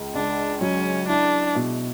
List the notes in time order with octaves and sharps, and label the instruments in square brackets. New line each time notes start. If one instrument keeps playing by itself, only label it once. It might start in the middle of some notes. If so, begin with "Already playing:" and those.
Already playing: [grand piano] C#2
[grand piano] C#2 [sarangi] D4
[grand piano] F#3 [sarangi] C#4
[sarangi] D4 [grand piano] E4
[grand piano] B2